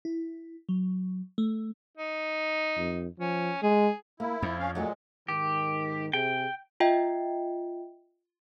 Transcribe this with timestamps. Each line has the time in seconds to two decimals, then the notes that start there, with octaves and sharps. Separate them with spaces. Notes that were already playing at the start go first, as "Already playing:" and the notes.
0.05 E4
0.69 F#3
1.38 A3
1.97 D#4
2.77 F2
3.19 F3 C#4
3.63 G#3 G#4
4.20 A#3 E4
4.42 F2 F3
4.59 C#4 F5
4.75 A#2 F#3 G#3 A3 F#4
5.28 G#2 D#3 G4
6.13 C3 G#4 G5
6.80 F4 D#5 E5 G5